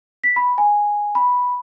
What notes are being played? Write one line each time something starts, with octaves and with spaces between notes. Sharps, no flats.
B6
B5
G#5
B5